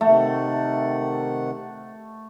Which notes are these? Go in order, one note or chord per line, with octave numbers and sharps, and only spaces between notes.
C3 D#3 A3 F#5